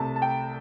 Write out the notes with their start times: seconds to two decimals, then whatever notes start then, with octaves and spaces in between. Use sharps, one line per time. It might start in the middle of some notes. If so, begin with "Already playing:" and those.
Already playing: C2 C3 A3 A5
0.16 A5
0.22 G5